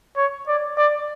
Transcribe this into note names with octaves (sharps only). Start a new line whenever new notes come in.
C#5
D5
D5